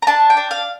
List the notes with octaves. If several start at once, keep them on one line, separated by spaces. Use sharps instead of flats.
A#5
D4 A5
G5
D4
F5